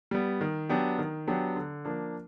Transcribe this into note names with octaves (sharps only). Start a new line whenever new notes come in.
G3 B3
D#3
F#3 B3 D4 G4
D#3
F#3 B3 D4 G4
D3
F3 A#3 D4